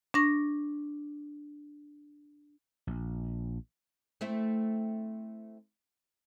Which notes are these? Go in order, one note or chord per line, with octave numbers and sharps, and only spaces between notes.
D4 C#6 A#6
A#1
A3 C4 E4